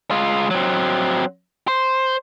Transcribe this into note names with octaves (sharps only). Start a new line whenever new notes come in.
G#3 F4
F#3 C4
C5